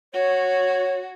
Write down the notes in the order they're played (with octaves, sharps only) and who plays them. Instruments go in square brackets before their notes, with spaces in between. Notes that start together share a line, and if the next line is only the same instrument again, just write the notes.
[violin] F#4 [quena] C#5